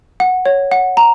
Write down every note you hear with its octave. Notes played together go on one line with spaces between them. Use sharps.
F#5
C#5
F#5
A#5